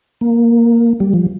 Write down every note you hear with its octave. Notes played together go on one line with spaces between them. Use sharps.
A#3
G3
F3